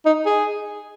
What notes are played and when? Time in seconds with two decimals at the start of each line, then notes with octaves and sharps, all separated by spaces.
0.06 D#4
0.26 G#4